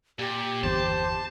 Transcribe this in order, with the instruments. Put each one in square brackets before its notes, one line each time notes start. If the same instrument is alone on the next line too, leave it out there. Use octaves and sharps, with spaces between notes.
[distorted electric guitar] A#2 [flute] G4
[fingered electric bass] G1 E2 [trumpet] C5 [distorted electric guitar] A5